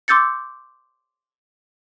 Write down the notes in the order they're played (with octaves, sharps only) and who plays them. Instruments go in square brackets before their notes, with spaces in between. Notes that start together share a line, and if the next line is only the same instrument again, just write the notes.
[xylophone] C6 D6 E6 G6 A6 C#7